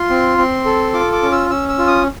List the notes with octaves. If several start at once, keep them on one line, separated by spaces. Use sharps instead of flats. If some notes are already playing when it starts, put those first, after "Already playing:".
Already playing: F4 C6
C4
C4
A4
F4 D6
D6
C#4
E6
C#4 E6
E6
F4
D#6